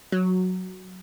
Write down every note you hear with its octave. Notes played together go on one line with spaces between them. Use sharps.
F#3